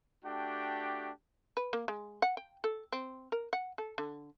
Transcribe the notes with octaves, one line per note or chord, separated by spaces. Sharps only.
A3 D4 F#4 G4 G5
B4
A#3
G#3
F#5
G5
A4
C4
A#4
F#5
A4
D3